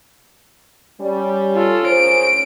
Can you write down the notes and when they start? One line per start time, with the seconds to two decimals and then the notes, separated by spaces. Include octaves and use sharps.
1.01 G3 C#4
1.54 F4 A4
1.87 C#4 G#4 A#4 C5 D7